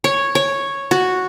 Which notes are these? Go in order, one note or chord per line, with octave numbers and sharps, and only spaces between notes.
C#5
C#5
F#4